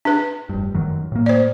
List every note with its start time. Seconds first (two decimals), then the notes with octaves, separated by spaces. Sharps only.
0.05 D4 B4
0.49 F1 G2
0.74 F#2 D#3 F#3
1.12 A2 A#3
1.26 C5 D5